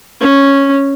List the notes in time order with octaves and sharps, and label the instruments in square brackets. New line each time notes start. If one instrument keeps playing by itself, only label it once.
[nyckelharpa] C#4